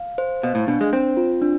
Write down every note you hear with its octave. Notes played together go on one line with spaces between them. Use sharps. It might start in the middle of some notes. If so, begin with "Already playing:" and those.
Already playing: F5
C5
B2 F5
A2
B2 D4
G#3
C4 C5
F4
D4